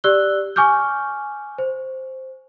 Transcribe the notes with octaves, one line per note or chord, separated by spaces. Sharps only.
G4 D5 E6 F#6 G7
G#5 C#6 D6 F6 G6
C5